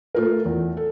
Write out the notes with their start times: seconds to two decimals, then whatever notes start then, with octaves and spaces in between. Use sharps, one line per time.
0.15 A3 F4 A#4
0.45 E2
0.77 A4